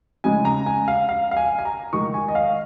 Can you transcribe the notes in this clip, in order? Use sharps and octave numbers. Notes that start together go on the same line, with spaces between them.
C#3 G#3 D#4 G#5
A#5
G#5
F5
F5
F5
G#5
G#5
A#5
D#3 G#3 D#4 C#6
G#5
D#5
F5